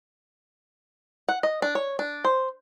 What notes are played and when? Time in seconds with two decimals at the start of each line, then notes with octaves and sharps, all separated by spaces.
1.29 F#5
1.43 D#5
1.62 D4
1.75 C#5
1.99 D4
2.24 C5